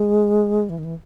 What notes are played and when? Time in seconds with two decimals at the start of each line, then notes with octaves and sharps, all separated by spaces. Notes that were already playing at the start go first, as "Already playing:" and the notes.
Already playing: G#3
0.70 E3
0.79 D#3
0.84 E3